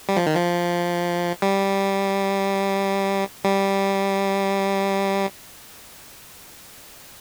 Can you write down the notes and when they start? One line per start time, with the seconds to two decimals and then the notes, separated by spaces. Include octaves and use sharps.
0.09 G3
0.16 F3
0.27 D#3
0.35 F3
1.42 G3
3.44 G3